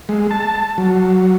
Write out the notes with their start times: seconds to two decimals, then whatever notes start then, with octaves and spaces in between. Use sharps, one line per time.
0.09 G#3
0.31 A5
0.78 F#3